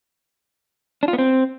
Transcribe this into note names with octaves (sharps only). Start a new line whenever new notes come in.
D4
F4
B3
C4